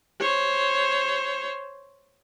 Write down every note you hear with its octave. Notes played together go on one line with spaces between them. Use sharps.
C5 C#5